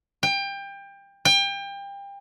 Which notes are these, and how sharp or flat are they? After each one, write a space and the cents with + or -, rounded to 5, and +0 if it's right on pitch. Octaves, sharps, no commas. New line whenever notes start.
G5 +25
G5 +30